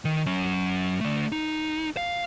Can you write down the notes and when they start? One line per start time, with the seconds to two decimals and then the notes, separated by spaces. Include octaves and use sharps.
0.05 D#3
0.26 F#3 C#4
1.01 D3 A3
1.32 D#4
1.97 F5